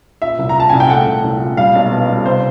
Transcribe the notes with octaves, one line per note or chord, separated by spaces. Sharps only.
A#2 E5
C2
A#5
A#2 A5
C2 G#5
G5
A3 F#5
C2
C2
A#2
G3 F5
B1
B2
G3
C3 C5